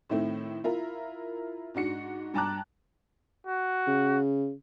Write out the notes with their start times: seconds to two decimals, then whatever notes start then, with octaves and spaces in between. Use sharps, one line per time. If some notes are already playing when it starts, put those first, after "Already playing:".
0.10 A2 D#3 A3 C4
0.64 E4 F4 A#4
1.74 G#2 D4 F#4 C#7
2.34 G2 G5 A5 A#5 D6 F#6
3.47 F#4
3.87 C#3